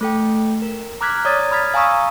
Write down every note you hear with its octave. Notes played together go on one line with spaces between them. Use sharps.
A3 A4 G5
A#4
A#5 D6 F6 F#6 G#6 B6
C#5 D5 A#5 D#6 G#6 A6
B5 D#6 F6 G#6 A6 B6
F5 G#5 A#5 C#6 D#6 E6